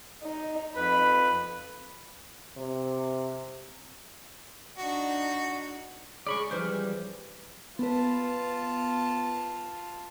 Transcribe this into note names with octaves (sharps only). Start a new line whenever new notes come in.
D#4
F2 B4 B5
C3
D4 D#4 F#4
C#3 G#3 G#4 D5 B5 C#6
E3 F3 G3 B4 C5 E5
B3 F4 B4 A5